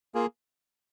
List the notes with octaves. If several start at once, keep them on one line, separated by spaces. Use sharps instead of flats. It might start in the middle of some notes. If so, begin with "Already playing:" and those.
A#3 F4 G#4